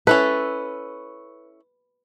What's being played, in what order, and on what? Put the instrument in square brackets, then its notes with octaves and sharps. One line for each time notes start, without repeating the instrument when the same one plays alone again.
[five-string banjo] C#4 E4 A4 [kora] B4